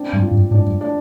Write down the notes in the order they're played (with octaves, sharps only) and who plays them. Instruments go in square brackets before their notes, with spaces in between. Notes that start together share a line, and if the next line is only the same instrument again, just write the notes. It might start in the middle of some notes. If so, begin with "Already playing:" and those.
Already playing: [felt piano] C4 D4
[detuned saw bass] G2
[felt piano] F4
[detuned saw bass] G2
[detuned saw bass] G#2 [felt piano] D4
[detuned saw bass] G2
[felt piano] D4